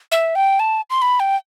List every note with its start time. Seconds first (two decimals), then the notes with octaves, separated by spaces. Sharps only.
0.12 E5
0.35 G5
0.60 A5
0.90 C6
1.02 B5
1.20 G5